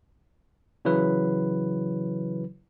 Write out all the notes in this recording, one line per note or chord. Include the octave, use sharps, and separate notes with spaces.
C#3 E3 F#3 E4 B4